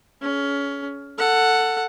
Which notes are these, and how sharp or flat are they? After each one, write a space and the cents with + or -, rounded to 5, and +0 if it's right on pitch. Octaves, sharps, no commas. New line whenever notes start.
C#4 +20 G#4 +35
A4 +20 F#5 +0